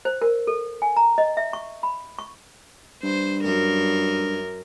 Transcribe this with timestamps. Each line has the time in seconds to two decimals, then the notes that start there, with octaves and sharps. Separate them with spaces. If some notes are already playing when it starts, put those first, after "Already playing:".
0.05 C5
0.21 A#4
0.47 A4
0.82 G#5
0.97 A#5
1.18 D#5
1.37 E5
1.53 C#6
1.83 B5
2.19 C#6
3.03 G2 C5
3.44 F#2 A#4